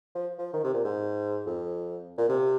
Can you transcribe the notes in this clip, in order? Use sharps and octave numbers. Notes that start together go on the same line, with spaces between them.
F3
F3
D#3
C3
A#2
G#2
F2
A#2
C3